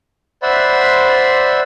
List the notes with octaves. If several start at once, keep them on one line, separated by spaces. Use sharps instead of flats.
C5 D5 E5 F#5 B5 C6